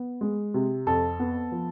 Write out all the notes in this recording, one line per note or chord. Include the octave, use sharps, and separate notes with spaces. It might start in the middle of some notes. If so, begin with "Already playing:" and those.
Already playing: B3
G#3
C3
F2 A4
B3
F3